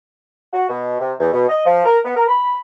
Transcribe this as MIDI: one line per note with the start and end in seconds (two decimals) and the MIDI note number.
0.53 0.68 66
0.69 0.96 47
1.00 1.13 48
1.20 1.30 40
1.33 1.47 47
1.49 1.61 75
1.65 1.81 53
1.85 1.99 70
2.05 2.16 59
2.16 2.25 70
2.27 2.58 83